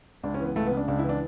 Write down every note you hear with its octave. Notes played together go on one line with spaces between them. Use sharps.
C#2 D4
C#4
E3
B3
C#2 A3
B3
C#3
D4
C#2 D4
E4
E3 D4